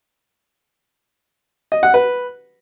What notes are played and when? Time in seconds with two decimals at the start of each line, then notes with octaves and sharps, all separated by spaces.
1.72 D#5
1.83 F#5
1.94 B4